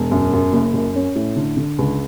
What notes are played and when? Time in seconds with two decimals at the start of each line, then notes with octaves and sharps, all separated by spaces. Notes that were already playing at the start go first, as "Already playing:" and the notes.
Already playing: E1
0.11 F#2
0.33 F#2
0.53 F#1
0.74 F#2
0.96 C#4
1.15 A2
1.36 D3
1.57 D3
1.78 C#2